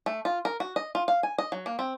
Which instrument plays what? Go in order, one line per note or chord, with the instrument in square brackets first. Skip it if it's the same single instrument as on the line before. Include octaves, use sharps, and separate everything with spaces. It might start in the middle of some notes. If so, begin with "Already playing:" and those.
[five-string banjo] A3
F4
A#4
F#4
D#5
F4
F5
G#5
D#5
F#3
A#3
C4